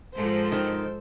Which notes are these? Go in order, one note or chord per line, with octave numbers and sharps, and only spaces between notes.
G#2 F3 A4 C5
D#3